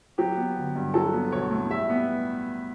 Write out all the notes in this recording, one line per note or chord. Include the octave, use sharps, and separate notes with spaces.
F#3 G4
B3
G1
G2
F#3 A4
B3
B1 C#5
A2
G3 E5
B3